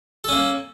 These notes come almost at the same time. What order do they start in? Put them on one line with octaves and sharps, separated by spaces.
A4 C#4 A#3